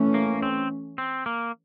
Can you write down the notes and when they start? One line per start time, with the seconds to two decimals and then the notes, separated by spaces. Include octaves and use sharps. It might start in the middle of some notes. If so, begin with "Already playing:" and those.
Already playing: E3 A3 C#4
0.14 A#3
0.42 C4
0.98 C4
1.26 A#3